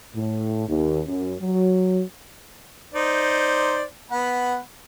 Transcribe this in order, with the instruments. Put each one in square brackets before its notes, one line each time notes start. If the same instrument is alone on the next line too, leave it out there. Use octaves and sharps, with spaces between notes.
[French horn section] A2
D#2
F#2
F#3
[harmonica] D#4 C5 D5
B3 F#5 B5